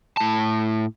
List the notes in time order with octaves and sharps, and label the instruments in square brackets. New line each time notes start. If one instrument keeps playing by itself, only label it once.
[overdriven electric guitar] A2 A5